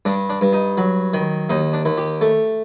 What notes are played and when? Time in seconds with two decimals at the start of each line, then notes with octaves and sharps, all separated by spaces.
0.05 G2 D4
0.30 D4
0.41 G2
0.53 D#4
0.77 F#3
1.14 D#3
1.49 D#2 D#4
1.73 D4
1.85 D#2
1.97 G4
2.21 A3